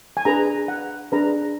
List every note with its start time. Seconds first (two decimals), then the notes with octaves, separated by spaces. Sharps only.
0.17 G#5
0.25 D4 G#4 B4 A#5
0.68 F#5
1.12 D4 G#4 B4 A#5